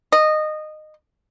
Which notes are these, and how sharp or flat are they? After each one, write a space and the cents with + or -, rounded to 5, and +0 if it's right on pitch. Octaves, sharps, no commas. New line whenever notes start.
D#5 -15